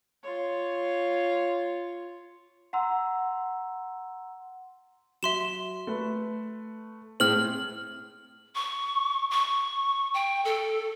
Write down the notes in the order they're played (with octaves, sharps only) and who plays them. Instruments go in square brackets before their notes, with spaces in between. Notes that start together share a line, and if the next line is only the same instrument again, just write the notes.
[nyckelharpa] F4 C#5
[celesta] F#5 A#5 C6 E6
[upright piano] F#3 [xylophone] E5 C6 E7
[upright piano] A3 B4
[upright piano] A2 G#3 C4 [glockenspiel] F6 F#7
[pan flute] C#6
C#6
G5
A4